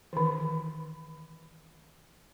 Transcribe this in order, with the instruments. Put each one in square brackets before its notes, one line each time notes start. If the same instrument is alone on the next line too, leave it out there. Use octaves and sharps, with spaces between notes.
[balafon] D#3 E3